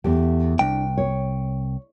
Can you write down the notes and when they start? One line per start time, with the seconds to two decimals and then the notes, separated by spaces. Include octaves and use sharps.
0.04 E2 A3 G4
0.59 C2 D4 G5
0.97 C#5